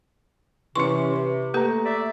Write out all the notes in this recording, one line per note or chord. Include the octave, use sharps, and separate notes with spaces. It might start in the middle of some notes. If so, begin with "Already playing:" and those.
C3 E3 C#4 C6 C#6 C#7
B4
A3 A#3 G4 B4 A#5
D5 E5